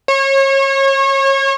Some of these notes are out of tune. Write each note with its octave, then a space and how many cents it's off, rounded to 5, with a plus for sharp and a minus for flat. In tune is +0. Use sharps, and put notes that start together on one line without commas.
C#5 -30